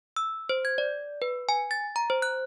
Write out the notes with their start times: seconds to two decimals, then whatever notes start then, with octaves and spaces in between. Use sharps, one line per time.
0.16 E6
0.49 C5
0.65 G#6
0.78 D5
1.22 B4
1.49 G#5
1.71 A6
1.96 A#5
2.10 C5
2.22 F#6